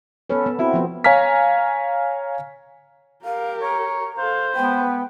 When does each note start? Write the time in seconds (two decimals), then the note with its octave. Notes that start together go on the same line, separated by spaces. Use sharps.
0.30 B3 C#4 A4 B4
0.46 B3
0.59 C4 E4 F#4
0.74 F3 B3
1.04 C#5 F5 G#5 A#5 F6 B6
3.25 G4 A#4 F5
3.62 C#5 A#5
4.18 A4 C5 F5
4.55 G#3 B3 B4 G5